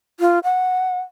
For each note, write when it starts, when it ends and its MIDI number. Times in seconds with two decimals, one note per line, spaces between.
0.20 0.39 65
0.44 1.00 78